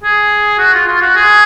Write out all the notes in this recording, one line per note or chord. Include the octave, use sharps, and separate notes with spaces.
G#4
F#4
F4
F4
F#4
G#4